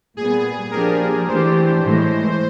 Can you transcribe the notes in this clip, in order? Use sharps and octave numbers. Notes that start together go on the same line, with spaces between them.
A#2 G3 B3 G#4
F3 A#3 D4 G4 A#4
E3 A3 D4 G4 C5
A2 E3 G#3